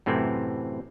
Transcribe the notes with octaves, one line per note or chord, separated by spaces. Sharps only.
F#2 A2 C3 E3 C4